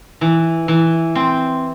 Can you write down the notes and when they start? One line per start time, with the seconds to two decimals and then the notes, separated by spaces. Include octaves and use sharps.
0.21 E3
0.68 E3
1.15 C4